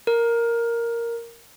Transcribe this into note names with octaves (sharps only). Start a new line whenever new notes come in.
A#4